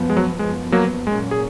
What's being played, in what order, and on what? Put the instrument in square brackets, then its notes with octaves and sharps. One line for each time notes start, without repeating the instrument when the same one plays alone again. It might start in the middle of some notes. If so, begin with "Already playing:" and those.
Already playing: [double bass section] F#2 F3 B3
[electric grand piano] G#3
F#3
[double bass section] F#2 F3 B3 [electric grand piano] G#3
[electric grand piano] F#3 A#3
[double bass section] A#2 F#3 A#3 C#4 [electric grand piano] G#3
[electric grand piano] G#4